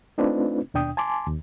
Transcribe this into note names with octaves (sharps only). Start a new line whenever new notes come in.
A3 C4 D4 D#4 F4 B4
D#2 B2 D4 G5 D#6
G#5 A5 C6 D6
D#2